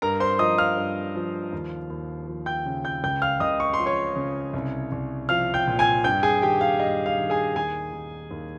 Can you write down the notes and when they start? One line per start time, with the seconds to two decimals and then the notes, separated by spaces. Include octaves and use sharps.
0.02 G2 A#4 A#5
0.20 C5 C6
0.39 F3 D#5 D#6
0.58 F5 F6
0.77 G2
1.15 F3
1.53 D#2
1.90 D#2
2.27 F3
2.46 G5 G6
2.66 C#3
2.84 G5 G6
3.04 C#2 G5 G6
3.22 F5 F6
3.40 C#2 D#5 D#6
3.60 C#6
3.74 C6
3.79 F3
3.86 C#5 C#6
4.16 C#3
4.53 C2
4.92 C2
5.29 F3 F5 F6
5.54 G5 G6
5.67 A#2
5.79 G#5 G#6
6.04 G2 G5 G6
6.23 G#4 G#5
6.42 D#3 G4 G5
6.61 F5
6.80 G2 D#5
7.06 F5
7.18 D#3
7.30 G#4 G#5
7.55 D#2 G#4 G#5
7.93 D#3
8.31 D#2